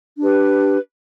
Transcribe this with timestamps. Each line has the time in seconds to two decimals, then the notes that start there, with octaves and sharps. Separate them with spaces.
0.18 D4 G4 B4